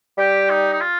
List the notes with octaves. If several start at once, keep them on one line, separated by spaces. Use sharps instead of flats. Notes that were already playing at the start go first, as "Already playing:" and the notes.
G3 G4
D#4
D#4
F4